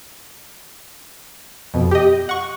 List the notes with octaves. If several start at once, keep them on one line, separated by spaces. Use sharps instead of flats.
F2 B2
G4 D#5
F#5 C#6